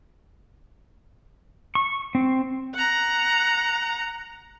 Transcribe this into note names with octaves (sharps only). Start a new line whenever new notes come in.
C#6
C4
F#5 A#5